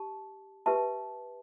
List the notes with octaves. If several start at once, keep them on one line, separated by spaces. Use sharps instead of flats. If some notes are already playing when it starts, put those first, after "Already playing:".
Already playing: G4 A5
G4 B4 E5 A5